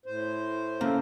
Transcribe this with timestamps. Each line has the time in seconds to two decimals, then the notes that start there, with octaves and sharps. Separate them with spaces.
0.06 A2 C5
0.81 C#3 A#3 A4